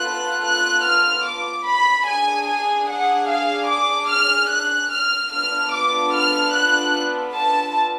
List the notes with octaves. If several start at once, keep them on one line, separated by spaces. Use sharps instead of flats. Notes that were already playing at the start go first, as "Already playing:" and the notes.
Already playing: B3 F4 A4 F#6
F#6
F6
D6
B5
D4 G#4 G#5
G#5
F#5
F5
D6
F6
F#6
F6
B3 D4 F4 A4 F6
D6
F6
F#6
A5